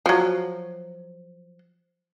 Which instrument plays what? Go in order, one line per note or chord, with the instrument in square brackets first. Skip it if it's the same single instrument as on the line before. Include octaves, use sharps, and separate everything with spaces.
[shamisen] F3 F#3